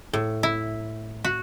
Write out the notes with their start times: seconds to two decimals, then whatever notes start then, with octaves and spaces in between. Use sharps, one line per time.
0.13 A2
0.43 E4
1.24 F#4